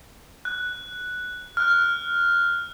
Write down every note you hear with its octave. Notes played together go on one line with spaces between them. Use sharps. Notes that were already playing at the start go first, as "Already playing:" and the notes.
F#6
F6 F#6